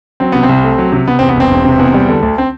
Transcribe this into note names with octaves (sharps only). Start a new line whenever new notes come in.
F#3 C4
C3 B3
C4
C2
A3
F#3
C3
C3 B3
C4
E2
B3
E1 C4
E1
C3
E2
G3
D3
D2
C4